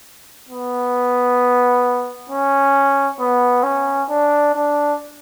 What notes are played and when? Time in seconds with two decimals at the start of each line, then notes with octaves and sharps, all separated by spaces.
0.49 B3
2.30 C#4
3.20 B3
3.63 C#4
4.09 D4
4.54 D4